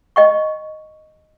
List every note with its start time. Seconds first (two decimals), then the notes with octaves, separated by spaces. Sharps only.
0.16 D#5 G5 C#6